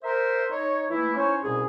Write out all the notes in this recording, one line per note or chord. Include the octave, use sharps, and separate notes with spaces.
A#4 C5 E5
D#4 C#5
E3 A3 A#3 E4
C#4 D#4 E4 C5 C#5
C2 B2 C#4 G#4